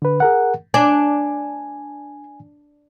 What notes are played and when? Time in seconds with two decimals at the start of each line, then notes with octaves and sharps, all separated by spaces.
0.02 D3 B4
0.20 G#4 A#4 F#5
0.74 D4 G#5